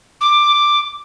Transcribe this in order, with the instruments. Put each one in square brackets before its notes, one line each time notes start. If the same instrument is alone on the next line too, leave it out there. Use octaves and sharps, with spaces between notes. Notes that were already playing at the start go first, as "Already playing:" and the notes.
[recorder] D6